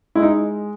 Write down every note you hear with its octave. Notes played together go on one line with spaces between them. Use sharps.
G#3 E4
D#4